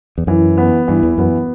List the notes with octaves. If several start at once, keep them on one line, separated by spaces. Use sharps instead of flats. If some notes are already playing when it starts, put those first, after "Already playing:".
E2
F#2 E3
B3
G2 E3
E2
F#2 B3